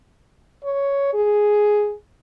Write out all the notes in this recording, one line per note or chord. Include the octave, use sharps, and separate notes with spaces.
C#5
G#4